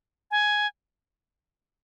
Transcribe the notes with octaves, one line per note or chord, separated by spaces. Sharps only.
G#5